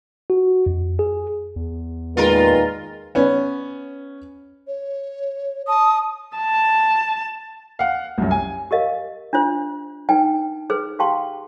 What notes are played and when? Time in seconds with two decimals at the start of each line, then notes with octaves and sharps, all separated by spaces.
0.30 F#4
0.66 F2
0.99 G#4
1.56 E2
2.17 A#2 D#3 G#3 F4 A#4 B4
3.15 B3 C#4
4.67 C#5
5.67 A5 D#6
6.37 A5
7.79 F5 F#5
8.18 C2 F#2
8.31 G#5
8.71 G4 A#4 D#5 F5
9.33 D4 F4 C5
10.09 D#4 B4 G5 G#5
10.70 G#4 B4 C5
10.99 G4 C5 F5 G5 A5 C6